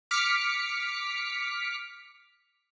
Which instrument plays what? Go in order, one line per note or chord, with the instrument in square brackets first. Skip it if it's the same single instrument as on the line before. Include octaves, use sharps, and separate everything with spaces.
[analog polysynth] D6 F6 B6 C#7